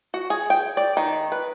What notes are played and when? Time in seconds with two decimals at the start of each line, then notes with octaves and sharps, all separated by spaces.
0.14 F#4
0.30 G#4
0.50 G5
0.77 D5
0.97 D#3
1.32 B4